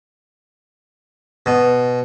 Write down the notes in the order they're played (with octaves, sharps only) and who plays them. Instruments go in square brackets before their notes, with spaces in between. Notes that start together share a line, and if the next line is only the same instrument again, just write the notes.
[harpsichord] B2